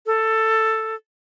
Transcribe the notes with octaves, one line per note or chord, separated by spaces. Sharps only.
A4